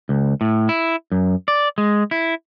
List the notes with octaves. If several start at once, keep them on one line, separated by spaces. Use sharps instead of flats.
C#2
A2
E4
F#2
D5
G#3
E4